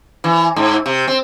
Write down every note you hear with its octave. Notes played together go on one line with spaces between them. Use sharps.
E3
G#2
C3
C4